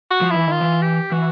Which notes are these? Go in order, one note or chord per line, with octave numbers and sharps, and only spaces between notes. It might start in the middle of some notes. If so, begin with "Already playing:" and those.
F#4
F3
E3 E4
D#3 F4
E3
G4
E3 F#4